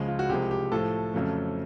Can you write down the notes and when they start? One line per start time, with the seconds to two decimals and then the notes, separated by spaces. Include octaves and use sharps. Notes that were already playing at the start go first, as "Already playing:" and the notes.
Already playing: C#2 C#3 F3 G#3
0.08 F4
0.19 F#4
0.29 C2 C3 F3 G#3 G4
0.51 G4
0.72 A2 F3 A3 A4
1.14 F2 C#3 F#3 A3